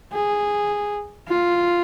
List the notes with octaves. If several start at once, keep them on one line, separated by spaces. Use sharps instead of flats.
G#4
F4